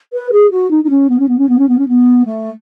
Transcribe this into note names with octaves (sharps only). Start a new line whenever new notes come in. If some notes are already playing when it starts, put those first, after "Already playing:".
B4
G#4
F#4
D#4
D#4
C#4
B3
C#4
B3
C#4
B3
C#4
B3
C#4
B3
A3